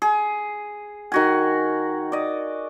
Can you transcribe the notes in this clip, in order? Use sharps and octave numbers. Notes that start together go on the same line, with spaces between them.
G#4
D#3 F#4 G#5
D5 D#5